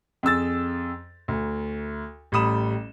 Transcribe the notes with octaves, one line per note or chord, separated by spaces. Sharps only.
F2 G#4 E6 A6
D2
A1 G3 B5 D#6 E7